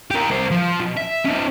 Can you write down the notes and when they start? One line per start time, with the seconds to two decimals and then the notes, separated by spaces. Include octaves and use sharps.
0.11 G4 A#4
0.29 C2 C5
0.51 F3
0.80 B2
0.97 E5
1.26 C#4 D#4